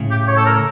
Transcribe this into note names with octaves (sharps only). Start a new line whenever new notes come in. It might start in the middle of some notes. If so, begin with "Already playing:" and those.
Already playing: A2 C#3
G4
C#5
A4
A#4